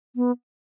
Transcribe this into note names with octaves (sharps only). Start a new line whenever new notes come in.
B3